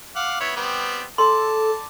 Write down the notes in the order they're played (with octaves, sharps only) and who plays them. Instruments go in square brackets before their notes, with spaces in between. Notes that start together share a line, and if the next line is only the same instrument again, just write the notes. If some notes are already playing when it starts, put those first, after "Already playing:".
[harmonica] F5 F#5 D6
B3 E4 C#5
G3 B3 C4
[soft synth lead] A4 [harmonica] D5 A5 [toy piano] C6